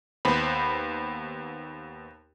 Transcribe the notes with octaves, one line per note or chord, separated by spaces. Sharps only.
D#2 B3 C5 B5